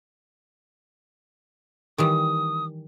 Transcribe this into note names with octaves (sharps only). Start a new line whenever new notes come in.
D#3 E3 G3 D#6